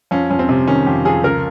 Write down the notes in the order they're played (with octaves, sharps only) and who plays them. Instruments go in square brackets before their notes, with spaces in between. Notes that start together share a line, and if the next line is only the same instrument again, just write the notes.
[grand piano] F2 C#4
F2 C#4
C4
C3
D#3 C#4
F2 G4
F2 G#4
C#2 A#4